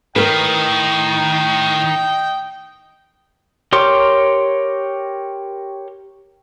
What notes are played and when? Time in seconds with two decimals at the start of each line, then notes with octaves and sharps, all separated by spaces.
0.16 A2 D#3 A#4 B4 D#5 G5
3.73 G4 A#4 C#5 C6 D6